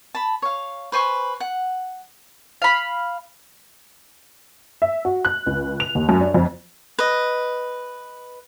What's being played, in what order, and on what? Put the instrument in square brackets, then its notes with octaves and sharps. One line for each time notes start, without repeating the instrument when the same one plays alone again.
[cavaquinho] A5 B5
C#5 F5
B4 C5 G#5 C#6
F#5
[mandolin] F5 B5
[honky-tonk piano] E5
F#4
F#6
C#2
F7
D#2
F#2
D4
F2
[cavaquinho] B4 D#5